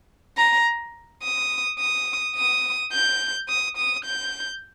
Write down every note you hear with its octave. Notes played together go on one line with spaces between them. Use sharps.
A#5
D#6
D#6
D#6
G6
D#6
D#6
G6